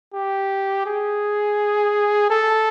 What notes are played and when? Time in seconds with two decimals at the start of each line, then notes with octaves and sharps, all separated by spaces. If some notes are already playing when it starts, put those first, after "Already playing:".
0.13 G4
0.86 G#4
2.30 A4